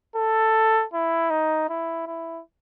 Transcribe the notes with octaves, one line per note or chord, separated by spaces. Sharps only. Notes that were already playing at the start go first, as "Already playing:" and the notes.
A4
E4
D#4
E4
E4